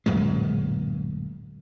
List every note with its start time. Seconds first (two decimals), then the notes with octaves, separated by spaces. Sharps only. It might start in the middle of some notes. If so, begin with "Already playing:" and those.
0.06 D1 F#2 A#2 G#3